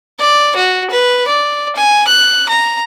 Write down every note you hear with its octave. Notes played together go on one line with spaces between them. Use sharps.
D5
F#4
B4
D5
G#5
F#6
A#5